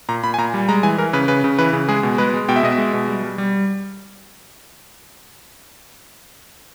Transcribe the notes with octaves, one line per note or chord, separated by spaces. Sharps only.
A#2 A#5
A#2 B5
G#5
A#2 A#5
G3
G#3 A#5
E3 G#5
E3 A#4
C#3 B4
C#3 B4
C#3
E3 B4
C#3
G#3 G#4
B2
G#3 B4
G#3
B2 G5
E5
B2 D#5
E5
G#3
B2
G3
G3
G3